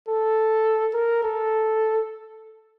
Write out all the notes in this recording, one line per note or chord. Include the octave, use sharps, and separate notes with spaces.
A4
A#4
A4